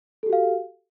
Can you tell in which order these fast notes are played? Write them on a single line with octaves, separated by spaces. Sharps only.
A4 G4 F#4 F5